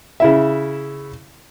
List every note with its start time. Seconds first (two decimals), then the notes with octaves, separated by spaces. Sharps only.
0.20 C#3 E4 E5